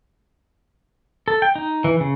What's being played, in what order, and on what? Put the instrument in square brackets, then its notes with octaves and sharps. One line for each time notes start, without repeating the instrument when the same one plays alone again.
[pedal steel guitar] A4
G5
D#4
E3
C#3